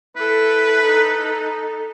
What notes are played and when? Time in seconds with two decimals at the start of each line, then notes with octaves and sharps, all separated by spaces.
0.16 E4 A4 B4
0.85 D#4 A4